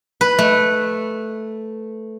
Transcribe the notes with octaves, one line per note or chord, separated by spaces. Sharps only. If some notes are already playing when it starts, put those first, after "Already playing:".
B4
A3